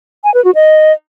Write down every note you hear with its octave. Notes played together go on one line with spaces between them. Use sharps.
G#5
B4
F#4
D#5